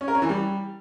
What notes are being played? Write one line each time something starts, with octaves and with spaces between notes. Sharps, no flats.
C#4
A#4
C#4
E3
G3